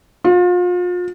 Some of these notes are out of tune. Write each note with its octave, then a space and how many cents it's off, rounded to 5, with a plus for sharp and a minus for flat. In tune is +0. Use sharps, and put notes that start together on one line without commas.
F4 +35